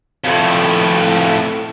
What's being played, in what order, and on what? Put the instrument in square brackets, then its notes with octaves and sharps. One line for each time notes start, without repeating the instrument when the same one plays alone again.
[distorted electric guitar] F2 A2